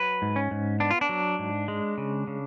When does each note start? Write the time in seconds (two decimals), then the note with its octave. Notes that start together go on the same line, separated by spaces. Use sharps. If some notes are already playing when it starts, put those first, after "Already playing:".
Already playing: F#3 B4
0.22 G#2
0.36 C#4
0.51 G#2
0.80 B3 D4
0.91 F4
1.01 D4
1.09 F#3
1.39 G#2
1.68 G#3
1.98 C#3
2.27 C#3